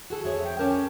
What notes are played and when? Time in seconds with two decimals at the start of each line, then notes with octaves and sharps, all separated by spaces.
0.10 F#4 G#4 A4
0.24 F2 G#4 C#5 E5
0.44 G5
0.59 C#4 G4 A#4 A5